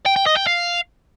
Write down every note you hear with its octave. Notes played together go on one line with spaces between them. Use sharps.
G5
G5
D#5
G5
F5